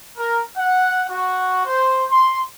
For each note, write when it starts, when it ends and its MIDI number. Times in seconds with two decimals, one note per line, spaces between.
0.18 0.42 70
0.56 1.05 78
1.09 1.62 66
1.66 2.04 72
2.11 2.40 84